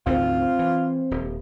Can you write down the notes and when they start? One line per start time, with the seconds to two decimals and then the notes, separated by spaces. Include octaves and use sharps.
0.06 G#1 D2 C#3 C4 F4 C5
0.59 E3
1.11 D#1